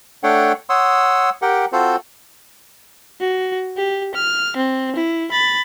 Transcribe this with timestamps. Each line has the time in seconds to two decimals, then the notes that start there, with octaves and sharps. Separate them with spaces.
0.23 A3 D4 A4 C#5 F#5 G5
0.69 C#5 F#5 C6 D#6 E6
1.42 G4 A#4 F#5 G5
1.73 C4 F4 F#4 A4 C5
3.20 F#4
3.77 G4
4.15 F6
4.57 C4
4.96 E4
5.31 B5 A6